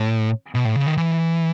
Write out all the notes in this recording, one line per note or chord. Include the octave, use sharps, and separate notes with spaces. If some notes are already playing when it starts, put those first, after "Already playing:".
Already playing: A2
B2
A2
C#3
D#3
E3